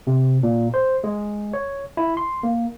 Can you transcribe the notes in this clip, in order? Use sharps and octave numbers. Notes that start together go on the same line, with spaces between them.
C3
A#2
C5
G#3
C#5
E4
C6
A#3